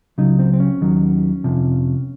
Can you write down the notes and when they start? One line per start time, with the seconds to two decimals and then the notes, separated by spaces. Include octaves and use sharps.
0.18 C#2 C#3 F#3 D#4
0.39 C4
0.53 C4
0.60 C#4
0.81 D#2 D#3 F#3
1.44 F2 C3 F3